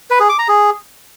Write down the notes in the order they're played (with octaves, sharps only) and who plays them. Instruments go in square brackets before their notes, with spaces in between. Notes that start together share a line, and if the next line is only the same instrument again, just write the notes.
[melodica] B4
G#4
D6
A#5
G#4